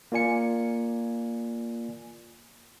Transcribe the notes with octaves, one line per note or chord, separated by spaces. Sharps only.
A#3 F4 D5 G#5 C#7